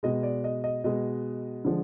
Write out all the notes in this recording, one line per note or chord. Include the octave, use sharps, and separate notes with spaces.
B2 G#3 D#5
D5
D#5
D#5
B2 G#3 D#5
D3 F3 G#3